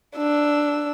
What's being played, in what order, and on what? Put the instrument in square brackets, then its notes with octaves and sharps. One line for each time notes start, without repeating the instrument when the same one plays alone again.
[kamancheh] D4 E6